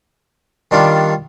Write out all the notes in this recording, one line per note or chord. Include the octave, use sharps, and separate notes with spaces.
D#3 G3 D4 F4